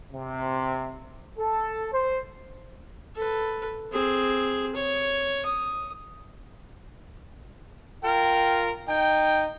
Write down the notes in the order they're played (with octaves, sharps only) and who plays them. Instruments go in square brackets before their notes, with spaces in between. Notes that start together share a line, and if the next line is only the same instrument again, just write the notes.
[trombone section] C3
A4
C5
[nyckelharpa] A4 B4
C4 G#4
C#5
D#6
[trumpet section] F4 A#4 [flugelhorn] G5
[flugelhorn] D#4 [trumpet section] G5